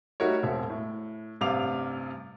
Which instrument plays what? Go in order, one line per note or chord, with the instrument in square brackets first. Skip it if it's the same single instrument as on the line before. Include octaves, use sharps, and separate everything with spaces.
[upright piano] G3 A3 D#4 F#4 A#4 C#5
E1 C4 E5
A2
A1 G2 C3 F5 D6 F7